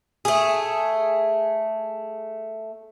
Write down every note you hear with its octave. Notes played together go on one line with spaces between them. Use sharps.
A3 G#4